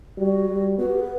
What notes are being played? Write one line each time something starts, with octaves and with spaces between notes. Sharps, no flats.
G3 F#4
G3
B3 F#4
G4
B4